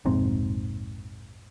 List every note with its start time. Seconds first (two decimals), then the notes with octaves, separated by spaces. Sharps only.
0.05 F1 A#1 G#2 C4